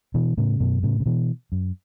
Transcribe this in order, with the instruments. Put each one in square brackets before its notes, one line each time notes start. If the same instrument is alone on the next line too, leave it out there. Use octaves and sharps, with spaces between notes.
[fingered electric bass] B2 E3
A2 C#3
F#2 B2
A2 C#3
C#3
B2 E3
F#2